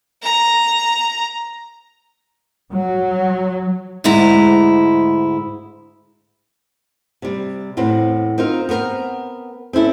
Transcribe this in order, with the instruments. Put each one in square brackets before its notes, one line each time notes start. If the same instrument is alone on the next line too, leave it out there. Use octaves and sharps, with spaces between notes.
[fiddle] A#5
[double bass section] F#3
[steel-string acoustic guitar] D2 G#2 G#3 E4 A#5
[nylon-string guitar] C3 G3
E2 A2 C4 B4
C4 D#4 F4 A#4
B3 C4 A#4
C4 C#4 E4 A4